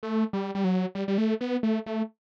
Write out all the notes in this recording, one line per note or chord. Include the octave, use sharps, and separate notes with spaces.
A3
G3
G3
F#3
G3
G3
A3
B3
A3
A3